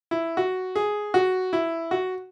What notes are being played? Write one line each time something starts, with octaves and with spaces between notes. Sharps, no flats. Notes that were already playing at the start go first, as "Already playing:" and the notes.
E4
F#4
G#4
F#4
E4
F#4